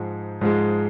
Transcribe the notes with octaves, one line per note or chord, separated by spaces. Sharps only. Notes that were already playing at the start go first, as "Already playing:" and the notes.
Already playing: G#2 F3 G#3 D#4
G#2 F3 G#3